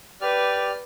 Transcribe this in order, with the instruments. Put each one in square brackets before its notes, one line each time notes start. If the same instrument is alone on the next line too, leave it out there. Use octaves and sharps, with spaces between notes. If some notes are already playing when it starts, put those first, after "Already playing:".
[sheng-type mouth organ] G4 D5 F6 [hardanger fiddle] B4